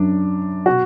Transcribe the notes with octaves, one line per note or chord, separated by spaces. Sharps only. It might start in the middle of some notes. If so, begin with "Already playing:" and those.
Already playing: F#2 F#3 D4
B2 F#4